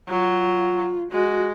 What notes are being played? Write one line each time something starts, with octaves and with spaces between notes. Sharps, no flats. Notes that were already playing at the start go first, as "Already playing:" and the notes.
F#3 F4
G#3 F#4